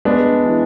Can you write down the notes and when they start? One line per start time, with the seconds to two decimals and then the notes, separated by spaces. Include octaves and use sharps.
0.05 G#3 B3 D4
0.46 E3